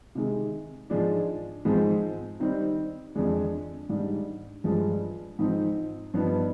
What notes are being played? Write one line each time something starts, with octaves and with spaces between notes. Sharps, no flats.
C3 D#3 G#3
G#2 F3 G#3 D4
G#2 F3 G#3 C4
D#3 G3 C4 D#4
F2 D3 G#3 D4
G#2 G3 D4
G2 F3 G#3
G#2 F3 C4 D#4
G2 F3 B3 D#4